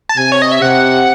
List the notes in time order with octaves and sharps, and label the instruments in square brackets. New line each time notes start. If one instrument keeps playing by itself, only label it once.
[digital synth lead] A5
[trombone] C3 [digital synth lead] G#5
[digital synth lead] C#5
D#5
E5
[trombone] C3 [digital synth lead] F#5